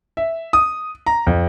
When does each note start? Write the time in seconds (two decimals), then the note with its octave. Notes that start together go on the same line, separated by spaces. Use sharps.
0.17 E5
0.53 D#6
1.06 A#5
1.27 F2